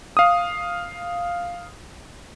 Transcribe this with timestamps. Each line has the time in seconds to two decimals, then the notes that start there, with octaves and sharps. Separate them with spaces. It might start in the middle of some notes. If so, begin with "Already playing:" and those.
0.17 F5 D#6